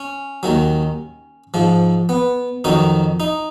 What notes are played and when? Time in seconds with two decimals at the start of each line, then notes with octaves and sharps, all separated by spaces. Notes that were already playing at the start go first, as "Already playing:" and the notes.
Already playing: C#4
0.43 D#2 D#3 F#3
1.54 G#2 F3
2.09 B3
2.64 F2 D#3 F#3 D#4
3.20 D#4